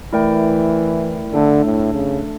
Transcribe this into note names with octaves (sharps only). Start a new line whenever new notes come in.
E3 A3 E4 A#4 D5 G5
D3 A3 D4 A4
A2
C#3